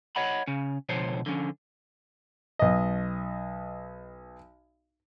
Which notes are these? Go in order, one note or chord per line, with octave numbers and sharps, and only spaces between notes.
C#5 D#5 F#5 B5
C#3 C#4
C#2 B2 D3 F3 C5 C#5
D3 F3 C#4
B1 D#5